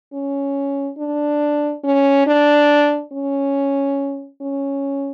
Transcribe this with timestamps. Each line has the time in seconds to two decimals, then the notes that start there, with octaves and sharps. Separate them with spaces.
0.13 C#4
0.98 D4
1.84 C#4
2.26 D4
3.12 C#4
4.41 C#4